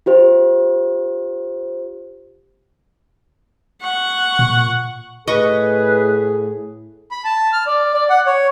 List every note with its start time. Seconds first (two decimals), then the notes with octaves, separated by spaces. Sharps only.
0.06 F4 G4 C5
3.82 F#5 C#6
4.39 A#2
5.27 A2 G#4 B4 D#5 C#6
7.11 B5
7.25 A5
7.53 F6
7.67 D5
7.94 D5
8.10 F#5
8.26 C#5